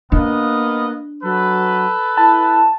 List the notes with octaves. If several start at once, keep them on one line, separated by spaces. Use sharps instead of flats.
A#3 B3 D4 D#5 F5
F#3 A4 B4
E4 A5